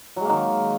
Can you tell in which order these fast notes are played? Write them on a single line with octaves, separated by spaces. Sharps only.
F#3 G#3 A#3 D#3